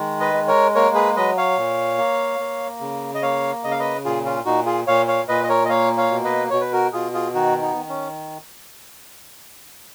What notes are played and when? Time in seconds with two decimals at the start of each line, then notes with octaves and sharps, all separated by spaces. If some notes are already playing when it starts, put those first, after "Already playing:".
Already playing: D#3 G#3
0.20 B4 D#5
0.34 G#3
0.48 A#4 C#5
0.75 A#3 A#4 C#5
0.95 G#4 B4
1.16 F#3 B4 D#5
1.37 C#5 F5
1.58 A#2
1.98 A#3
2.40 A#3
2.81 C#3
3.15 D#5
3.22 A#3 C#5 F5
3.64 C#3 D#5
3.71 F5
3.79 B4 D#5
4.05 A#2 F4 G#4
4.25 C#4 F4
4.46 A#2 D#4 F#4
4.66 F4 G#4
4.87 A#2 C#5 F5
5.07 C#5 F5
5.28 A#2 B4 D#5
5.44 D#5
5.49 A#4 C#5
5.65 D#5
5.69 A#3 C#5 F5
5.98 C#5 F5
6.11 B2
6.24 B4 D#5
6.50 B2 C#5
6.61 B4
6.73 F#4 A#4
6.93 B2 F4 G#4
7.14 F4 G#4
7.34 D#3 D#4 F#4
7.61 B3 D#4
7.76 D#3
7.89 C#4